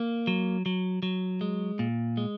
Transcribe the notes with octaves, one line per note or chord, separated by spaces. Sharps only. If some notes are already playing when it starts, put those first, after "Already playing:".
Already playing: A#3
F#3
F#3
F#3
G#3
A#2
G#3